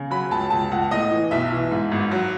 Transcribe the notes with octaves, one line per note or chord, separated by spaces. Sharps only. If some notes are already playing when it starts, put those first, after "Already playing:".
Already playing: C#3
F#3 B5
C#2 A5
C#2 A5
C#2 F#5
A2 D#5
E3
B1 E5
E3
G#2
G#1
F#3